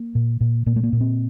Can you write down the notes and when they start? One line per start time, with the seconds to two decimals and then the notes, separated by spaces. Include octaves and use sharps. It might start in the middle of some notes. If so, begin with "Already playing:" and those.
Already playing: A#3
0.15 A#2
0.41 A#2
0.66 A#2 A#3
0.76 A3
0.83 A#3
0.93 A#2
1.01 C4